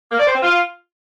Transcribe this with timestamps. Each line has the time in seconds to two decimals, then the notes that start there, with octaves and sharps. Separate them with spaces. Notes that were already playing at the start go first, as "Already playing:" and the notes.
0.10 A#3
0.18 D5
0.26 C5
0.34 C4
0.42 F4